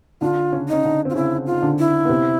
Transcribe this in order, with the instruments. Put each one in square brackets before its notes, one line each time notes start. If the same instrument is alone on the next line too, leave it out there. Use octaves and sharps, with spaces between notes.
[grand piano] D3 D4 [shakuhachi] F4
[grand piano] C#3 C#4
[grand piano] C#4 [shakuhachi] D#4
[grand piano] D3 D4
[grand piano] C4 [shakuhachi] F4
[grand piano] C#3 C#4 [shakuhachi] E4
[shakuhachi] F4
[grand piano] D#4
D3 D4
[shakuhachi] E4
[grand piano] B3
C3 C4